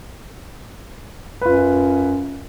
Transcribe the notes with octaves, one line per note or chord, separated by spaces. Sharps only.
F#2 F4 B4